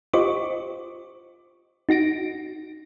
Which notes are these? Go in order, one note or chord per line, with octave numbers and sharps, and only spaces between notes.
F4 G4 C5 D#5 C#6 D6
D#4 F#4 A#6 D7